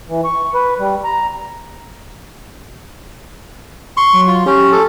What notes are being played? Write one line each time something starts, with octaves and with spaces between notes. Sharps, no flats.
E3
C#6
B4
G3
A#5
C6 C#6
F#3
F4
C#4 G4
A4